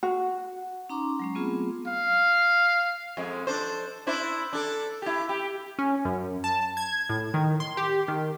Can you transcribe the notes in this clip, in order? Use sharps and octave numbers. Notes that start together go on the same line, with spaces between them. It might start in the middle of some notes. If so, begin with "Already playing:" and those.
F#4 F#5
C#4 D#4 A#5 C6 D6
F#3 G#3 C#4
F#3 A3 B3 C4 F4 G#4
F5
F2 G#3
D4 A4 C5
D4 E4 C5
D4 A4
E4 G4
G4
C#4
F#2
A5
G#6
A2
D#3
C6
G4
D#3